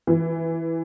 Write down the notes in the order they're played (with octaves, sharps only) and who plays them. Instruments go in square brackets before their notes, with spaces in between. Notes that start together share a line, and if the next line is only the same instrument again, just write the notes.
[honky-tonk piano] E3